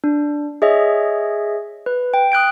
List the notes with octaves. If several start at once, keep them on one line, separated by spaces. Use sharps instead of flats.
D4
G#4 C#5 D#5 E5
B4
G5
D#6 F#6 G6 D7